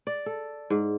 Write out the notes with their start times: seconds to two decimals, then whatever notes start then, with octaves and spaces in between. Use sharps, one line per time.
0.07 D5
0.26 A4
0.70 G#2